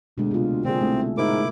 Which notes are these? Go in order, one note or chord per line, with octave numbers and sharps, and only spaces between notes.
D2 B2 G#3
C3 F4
A#2 D3 C4 G#4
C2 A3
G#2 E4 A#4 D6